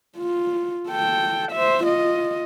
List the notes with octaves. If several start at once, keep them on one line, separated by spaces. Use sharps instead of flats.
F4
A4 G5
C5 E5
F4 D#5